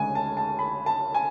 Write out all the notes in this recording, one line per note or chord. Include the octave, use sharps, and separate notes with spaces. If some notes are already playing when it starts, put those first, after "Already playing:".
Already playing: D2 C#3 G#3 G#5
A5
A5
B5
A5
G#5